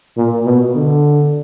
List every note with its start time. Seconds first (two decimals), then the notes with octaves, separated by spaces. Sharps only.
0.17 A#2
0.46 B2
0.76 D3